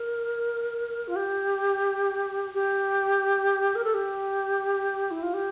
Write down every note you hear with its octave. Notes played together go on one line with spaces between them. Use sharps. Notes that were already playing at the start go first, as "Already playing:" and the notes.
Already playing: A#4
F4
G4
G4
A#4
A4
G4
E4
F4
G4